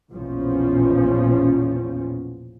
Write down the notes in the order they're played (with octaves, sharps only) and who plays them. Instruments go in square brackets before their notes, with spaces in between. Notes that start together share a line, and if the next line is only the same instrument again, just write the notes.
[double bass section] A#1 E2 B2 F3 C#4